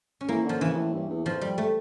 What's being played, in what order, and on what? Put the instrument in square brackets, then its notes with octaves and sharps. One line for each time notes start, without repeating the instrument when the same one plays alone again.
[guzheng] C#4
[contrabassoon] E3 [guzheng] A#3
[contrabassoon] D3 [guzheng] F3
[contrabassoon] C#3 [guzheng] E3
[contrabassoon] A2
G2
E2
[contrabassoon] F2 [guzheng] F3
[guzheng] G3
A3